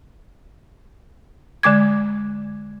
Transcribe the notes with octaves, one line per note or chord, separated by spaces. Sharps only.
D3 G#3 D6 G#6